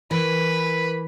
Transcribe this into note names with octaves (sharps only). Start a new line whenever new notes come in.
E3 A#4 B4 B5